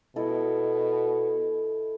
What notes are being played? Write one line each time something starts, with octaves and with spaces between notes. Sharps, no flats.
B2 E4 A4 D#5